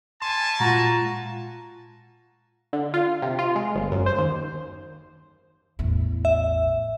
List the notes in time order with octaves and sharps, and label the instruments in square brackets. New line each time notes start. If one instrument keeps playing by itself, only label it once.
[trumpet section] G3 G#5 A5 [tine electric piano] C6
[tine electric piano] A#2 G#3 [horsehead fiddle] F4 [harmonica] F#4 A#5
[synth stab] D3
F4
C3
F4
G#3
G1
F#2
C5
D#2
[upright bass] A1 E2
[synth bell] E5